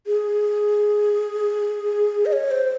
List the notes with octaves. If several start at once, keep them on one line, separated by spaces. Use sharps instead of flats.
G#4
D#5
C#5
C5